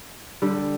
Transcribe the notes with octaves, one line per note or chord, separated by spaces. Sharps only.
D3 G3